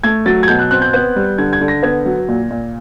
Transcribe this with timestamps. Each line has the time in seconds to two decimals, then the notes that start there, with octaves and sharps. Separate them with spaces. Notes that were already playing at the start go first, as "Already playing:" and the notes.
0.04 A3 G#6
0.26 F#3 A6
0.43 G#6
0.48 B2 G6
0.59 F#6
0.71 C4 F#6
0.82 G6
0.93 B3 G6
1.16 G3
1.38 D3 G#6
1.53 G#6
1.61 D3
1.68 A#6
1.83 B3 G#6
2.06 F#3
2.28 A#2
2.50 A#2